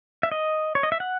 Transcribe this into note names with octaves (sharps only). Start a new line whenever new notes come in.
E5
D#5
C#5
D#5
E5
F#5